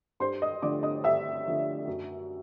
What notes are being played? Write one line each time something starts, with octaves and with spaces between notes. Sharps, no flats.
G2 C5 C6
D#5 D#6
D3 F3 A3 D5 D6
D#5 D#6
G2 E5 E6
D3 F3 A3
F#2